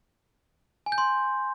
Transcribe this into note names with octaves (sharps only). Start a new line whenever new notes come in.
G#5
G6
C6